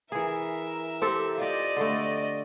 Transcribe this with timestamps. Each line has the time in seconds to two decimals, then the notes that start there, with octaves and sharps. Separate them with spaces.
0.12 E3 G#4 A#4 E5
1.02 C4 G4 A4
1.38 F4 G4 D5 D#5
1.77 D3 A3